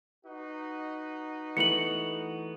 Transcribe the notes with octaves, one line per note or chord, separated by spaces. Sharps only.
D#4 F#4 B4
E3 A3 B3 C#7 F#7